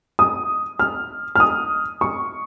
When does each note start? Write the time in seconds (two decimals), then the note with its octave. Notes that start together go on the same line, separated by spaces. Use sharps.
0.19 D#6
0.79 F6
1.35 F6
1.40 D#6
2.01 C#6